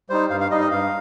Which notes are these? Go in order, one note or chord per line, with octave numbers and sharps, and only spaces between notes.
G3 D#4 C5
G2 F5
F5
G3 D#4 D#5
D#5
G2 F5